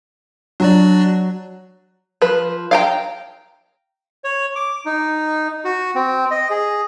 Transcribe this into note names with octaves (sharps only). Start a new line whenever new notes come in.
F#3 D4 F#4 D5
F3 B4
F5 G5 A#5
C#5
D6
D#4
F#4
C4
D#5
G#4